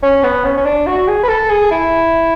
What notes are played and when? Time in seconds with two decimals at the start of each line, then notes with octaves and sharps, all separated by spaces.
0.03 C#4
0.23 B3
0.45 C#4
0.57 C#4
0.65 D4
0.87 F#4
1.08 G#4
1.23 B4
1.29 A4
1.50 G#4
1.71 E4